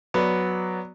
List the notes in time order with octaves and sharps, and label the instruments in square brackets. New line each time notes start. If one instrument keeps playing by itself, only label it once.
[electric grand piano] F#3 D5 [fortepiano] B3